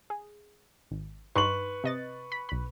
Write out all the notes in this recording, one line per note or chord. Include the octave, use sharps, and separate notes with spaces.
G#4
G#1
G2 D#4 B4 C6 C#6 F#7
C3 D#5 A6
B5
B1 B5